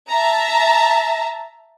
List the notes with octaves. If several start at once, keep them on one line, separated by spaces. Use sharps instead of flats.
E5 A5 A#5